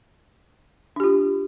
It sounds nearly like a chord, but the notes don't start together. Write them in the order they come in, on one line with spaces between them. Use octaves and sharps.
D4 G4 F4